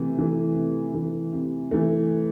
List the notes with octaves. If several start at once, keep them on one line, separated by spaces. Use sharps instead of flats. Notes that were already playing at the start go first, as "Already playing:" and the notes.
Already playing: C3 E3 A3
E3 A3
C3
E3 A3
C3
E3 A3